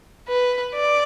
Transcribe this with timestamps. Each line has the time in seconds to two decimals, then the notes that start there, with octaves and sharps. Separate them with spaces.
0.28 B4
0.75 D5